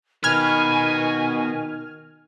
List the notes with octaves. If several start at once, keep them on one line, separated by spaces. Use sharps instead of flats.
B2 D#3 B4 G#5 F6 G#6